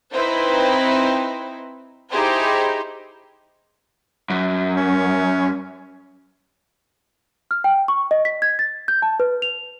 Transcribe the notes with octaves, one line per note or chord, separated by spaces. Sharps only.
C4 D#4 E4 B4 C5
D#4 E4 G4 G#4 C5
F#2
C#4
F6
G5
C#6
D#5
B6
G#6
A6
G6
A5
B4
F7